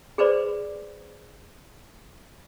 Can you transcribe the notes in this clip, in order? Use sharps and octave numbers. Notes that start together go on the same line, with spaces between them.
G#4 B4 C5 D5